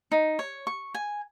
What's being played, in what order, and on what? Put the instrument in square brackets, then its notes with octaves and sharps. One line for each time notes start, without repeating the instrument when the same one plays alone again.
[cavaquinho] D#4
C#5
C#6
G#5